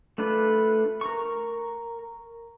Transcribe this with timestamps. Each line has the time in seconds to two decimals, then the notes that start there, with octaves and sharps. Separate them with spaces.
0.18 A3 D4 F4 B4
1.01 A#4 C#6